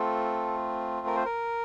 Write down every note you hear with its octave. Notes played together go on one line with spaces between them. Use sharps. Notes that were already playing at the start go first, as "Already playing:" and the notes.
Already playing: A3 C4 F4 A4
A#4
C5
A#4